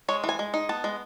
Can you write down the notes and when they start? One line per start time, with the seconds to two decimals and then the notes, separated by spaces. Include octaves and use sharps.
0.08 G#3 C#5
0.24 E3
0.29 G#5
0.39 G#3
0.54 D#4
0.69 B3 A5
0.84 G#3